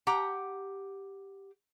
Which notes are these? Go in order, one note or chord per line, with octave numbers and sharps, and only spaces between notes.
G4 F#5 A#5